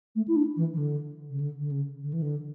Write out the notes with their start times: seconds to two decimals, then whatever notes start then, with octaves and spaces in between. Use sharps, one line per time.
0.15 A3
0.28 E4
0.36 D4
0.57 E3
0.73 E3
0.78 D3
1.30 C#3
1.40 D3
1.60 D3
1.71 C#3
2.03 D3
2.13 E3
2.22 D3